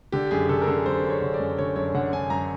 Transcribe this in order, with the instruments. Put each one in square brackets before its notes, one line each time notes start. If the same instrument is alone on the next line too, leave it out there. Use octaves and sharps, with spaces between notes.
[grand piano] D3 G4
F#2 G#4
D3 A4
A#4
D3 A4
F#2 C5
F#2
C#5
D3
D5
F#2
D3 C#5
F#2 C#5
D3 F#5
D3 G#5
F#2 A#5